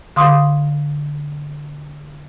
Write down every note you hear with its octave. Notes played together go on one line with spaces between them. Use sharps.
D3 F5 C6 D6 D#6